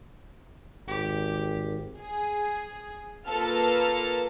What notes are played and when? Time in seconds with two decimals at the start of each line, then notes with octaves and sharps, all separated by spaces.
0.87 G#1 G4
1.98 G#4
3.27 A#3 F4 A4 B4 A5 F6